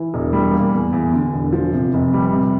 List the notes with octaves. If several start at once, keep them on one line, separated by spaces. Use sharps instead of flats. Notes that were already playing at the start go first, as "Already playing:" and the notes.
Already playing: E3
E1
G3
A#3
E2
E2
D3
E1
F3
C3
F1
G3
C3